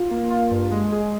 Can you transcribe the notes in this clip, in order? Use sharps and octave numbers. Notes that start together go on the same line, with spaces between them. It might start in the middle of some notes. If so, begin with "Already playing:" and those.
Already playing: F4
A#3
F4
G2
G#3
G#4